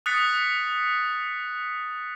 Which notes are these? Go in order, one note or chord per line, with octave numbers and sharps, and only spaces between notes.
D#6 F#6 A6 B6 C#7